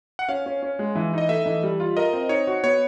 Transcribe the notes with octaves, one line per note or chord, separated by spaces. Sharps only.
F#5
C#4 F5
C#4
C#4
G#3
E3
D#4 D#5
A3 E5
E3
G3
F4
A#4 D#5
C4
D#4 C#5
F#4
B3 C#5